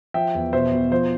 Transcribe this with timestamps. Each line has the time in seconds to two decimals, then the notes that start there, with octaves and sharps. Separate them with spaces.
0.14 F3 E5 G5
0.35 E2
0.53 B2 C5 E5
0.72 B2
0.91 F3 C5